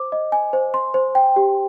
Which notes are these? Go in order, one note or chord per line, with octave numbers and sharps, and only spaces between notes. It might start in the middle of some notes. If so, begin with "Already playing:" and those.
Already playing: C5 D6
D#5
G#5
C5
C6
C5
G5
G4